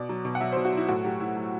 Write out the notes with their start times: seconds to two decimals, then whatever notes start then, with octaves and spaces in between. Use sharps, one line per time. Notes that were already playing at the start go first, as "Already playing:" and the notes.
Already playing: B2 D5
0.09 F#3
0.25 B2
0.35 F#5
0.40 F#3 E5
0.52 C5
0.57 B2
0.65 F#4
0.73 F#3 E4
0.89 A2 F#4
1.04 F#3 G4
1.20 A2 E4
1.36 F#3